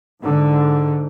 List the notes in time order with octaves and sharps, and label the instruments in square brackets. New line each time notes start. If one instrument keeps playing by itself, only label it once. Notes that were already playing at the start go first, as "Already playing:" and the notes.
[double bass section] G#2 D3